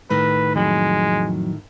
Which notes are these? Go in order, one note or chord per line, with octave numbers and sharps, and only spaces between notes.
A2 D#3 B4
F2 F#3 G#3 B5